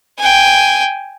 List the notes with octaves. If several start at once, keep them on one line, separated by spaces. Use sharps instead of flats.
G5 G#5